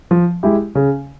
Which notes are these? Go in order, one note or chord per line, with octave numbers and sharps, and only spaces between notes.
F3
G#3 E4 G4
C#3